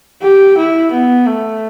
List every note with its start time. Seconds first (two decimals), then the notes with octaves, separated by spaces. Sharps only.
0.22 G4
0.57 E4
0.91 B3
1.27 A3